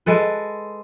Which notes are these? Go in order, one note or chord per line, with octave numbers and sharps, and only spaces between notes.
G#3 A4 B4